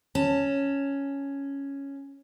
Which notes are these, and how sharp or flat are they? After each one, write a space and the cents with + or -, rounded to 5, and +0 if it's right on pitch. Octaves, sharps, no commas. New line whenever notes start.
C#4 +0 A5 +15